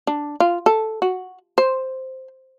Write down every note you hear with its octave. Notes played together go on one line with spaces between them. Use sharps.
D4
F4
A4
F#4
C5